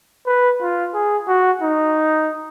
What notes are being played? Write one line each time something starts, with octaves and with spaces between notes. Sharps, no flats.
B4
F4
G#4
F#4
D#4